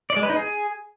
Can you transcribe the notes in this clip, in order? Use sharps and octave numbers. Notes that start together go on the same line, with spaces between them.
D5
G#3
B4
D#4
G#4